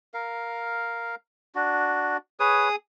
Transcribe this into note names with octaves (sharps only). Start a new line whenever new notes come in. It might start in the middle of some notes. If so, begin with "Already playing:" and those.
A#4 F5
D4 F#4
G#4 B4 C#5 D#6